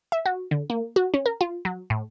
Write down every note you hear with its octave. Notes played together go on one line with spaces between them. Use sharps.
E5
F#4
D3
A#3
F#4
C#4
A#4
F4
F#3
A2